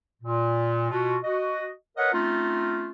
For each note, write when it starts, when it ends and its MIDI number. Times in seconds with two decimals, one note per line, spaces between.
0.23 0.88 46
0.91 1.16 47
0.91 1.16 65
0.91 1.16 66
1.24 1.69 66
1.24 1.69 75
1.97 2.11 70
1.97 2.11 71
1.97 2.11 73
1.97 2.11 75
1.97 2.11 78
2.13 2.91 57
2.13 2.91 60
2.13 2.91 61
2.13 2.91 63
2.13 2.91 65